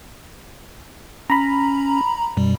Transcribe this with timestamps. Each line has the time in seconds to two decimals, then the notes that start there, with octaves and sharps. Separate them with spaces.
1.30 C#4 A#5 B5
2.37 F#2 B2 G3